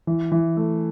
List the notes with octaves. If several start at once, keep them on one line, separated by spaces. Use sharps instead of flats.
E3
E3
A3